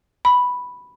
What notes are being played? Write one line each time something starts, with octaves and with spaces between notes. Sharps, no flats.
B5